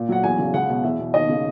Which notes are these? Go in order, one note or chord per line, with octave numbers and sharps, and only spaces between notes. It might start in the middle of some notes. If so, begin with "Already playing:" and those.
Already playing: A#2
F#3 F#5
E2 G#5
C#3
C#2 F#5
B2
E2 E5
B2
D#2 D#5
C#3